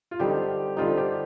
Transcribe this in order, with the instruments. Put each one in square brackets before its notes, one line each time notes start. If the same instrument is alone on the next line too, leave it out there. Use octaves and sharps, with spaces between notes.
[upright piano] F4
[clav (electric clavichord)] D3 G3 C4 D#4 [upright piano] G4
[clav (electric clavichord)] D3 G3 C4 D#4 [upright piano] F4
[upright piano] G4